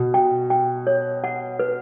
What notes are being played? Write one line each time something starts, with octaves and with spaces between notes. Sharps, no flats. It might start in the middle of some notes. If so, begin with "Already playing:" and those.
Already playing: B2
G5
G5
C#5
F#5
B4